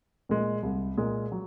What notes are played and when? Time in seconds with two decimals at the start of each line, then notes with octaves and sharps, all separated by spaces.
0.29 A#2 G#3
0.63 C2
0.97 A#2 G#3
1.32 F#3